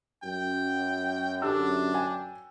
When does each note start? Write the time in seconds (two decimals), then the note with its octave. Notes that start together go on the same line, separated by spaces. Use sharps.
0.23 F#2 G5
1.42 D3 D4 G4 E6
1.94 G5 G#5